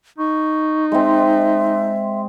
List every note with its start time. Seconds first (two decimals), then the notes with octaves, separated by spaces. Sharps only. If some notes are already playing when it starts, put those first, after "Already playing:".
0.19 D#4 C#6
0.92 G#3 C4 E5